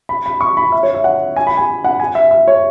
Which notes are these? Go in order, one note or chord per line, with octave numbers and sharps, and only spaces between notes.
B5
B5
C#6
B5
E5
C#5
E5
F#5
G#5
B5
G#5
F#5
G#5
E5
E5
C#5